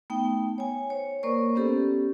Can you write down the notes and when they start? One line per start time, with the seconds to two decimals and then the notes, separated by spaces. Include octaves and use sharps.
0.10 A3 B3 D#4 G5
0.58 C#5 G#5
0.90 C5 C#5
1.23 A#3 A#4 C5 D5 C#6
1.55 B3 C#4 G4 A4